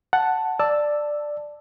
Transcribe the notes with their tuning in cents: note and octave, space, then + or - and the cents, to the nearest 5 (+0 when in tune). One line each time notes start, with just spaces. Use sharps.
F#5 +0 A5 +0
D5 +5 A5 +5 E6 +0